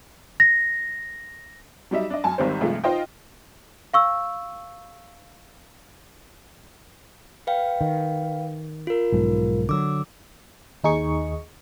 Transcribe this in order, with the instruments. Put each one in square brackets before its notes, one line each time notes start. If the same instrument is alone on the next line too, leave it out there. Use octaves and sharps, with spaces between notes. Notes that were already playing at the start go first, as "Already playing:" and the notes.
[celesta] A#6
[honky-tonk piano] F#3 G3 D#4 E5
D4 D#5
F#2 G#5 A5
G#1 D#3 G3 C4 C5
G2 C3 F3 G#3 A3
D#4 F4 C5 D#5 G5
[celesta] F5 C#6 E6
[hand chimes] B4 F5 G5
[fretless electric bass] D#3
[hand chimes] F4 A#4
[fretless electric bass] B1 G#2 F3
[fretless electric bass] D3 F3 F#3 [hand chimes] D6 E6
[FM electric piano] D#2 D#4 G#4 C#6